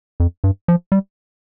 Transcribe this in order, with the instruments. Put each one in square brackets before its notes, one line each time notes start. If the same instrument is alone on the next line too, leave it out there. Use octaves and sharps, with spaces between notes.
[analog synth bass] F2
G2
F3
G3